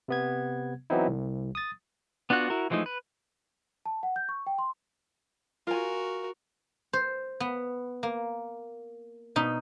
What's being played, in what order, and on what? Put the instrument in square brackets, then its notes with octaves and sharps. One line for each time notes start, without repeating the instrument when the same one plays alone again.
[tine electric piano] C3 B3 G#6
E3 F#3 B3 C4 D#4 E4
C2
D#6 A6
[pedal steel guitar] B3 D4 F4 F#4 F#6
E4 F#4 A#4
E3 F3 G#3 A3 D#4
B4
[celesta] A5
F#5
G6
C#6
G5
C6
[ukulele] F4 G#5 [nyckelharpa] F#4 A#4
[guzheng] C5
B3
A#3
B2 D#4